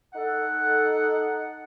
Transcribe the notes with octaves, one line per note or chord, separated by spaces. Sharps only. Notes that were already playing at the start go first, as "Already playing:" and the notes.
D#4 A4 F#5